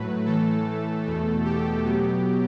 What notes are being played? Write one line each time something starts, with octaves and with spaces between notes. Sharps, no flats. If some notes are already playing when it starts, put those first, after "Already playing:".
Already playing: A2 F#3 A3 B4
A2 E3 A3 A4
E2 B2 A3
G4
B2 F#3 B3 G4